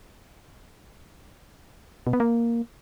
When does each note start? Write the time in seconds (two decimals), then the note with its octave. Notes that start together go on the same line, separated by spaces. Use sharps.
2.07 B2
2.13 B3
2.20 A#3